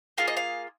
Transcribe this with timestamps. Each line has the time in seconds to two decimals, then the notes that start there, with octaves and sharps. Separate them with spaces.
0.18 A#3 F4 G#4 F5
0.28 D#5
0.37 F5